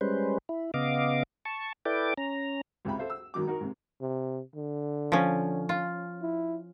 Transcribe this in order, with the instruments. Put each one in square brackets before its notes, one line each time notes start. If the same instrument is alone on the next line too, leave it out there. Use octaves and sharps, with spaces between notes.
[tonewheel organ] G3 G#3 C#4 B4 C5
E4
C#3 B3 D#5 F5 D6
A5 C#6
E4 A4 B4 D5 G5 D6
C#4 A#5
[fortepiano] C#2 G#2 C3 E5 G5 B5
A4 C5 E5 F5
E6
G#1 B2 D#3 F#3 D6
D#4 F#4 A#4
G#2 C3
[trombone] C3
D3
[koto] F3 C#4
F4
[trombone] E4